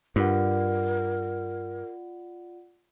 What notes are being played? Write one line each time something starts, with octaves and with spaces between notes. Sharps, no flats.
G2 F4 A#4 D5 F#5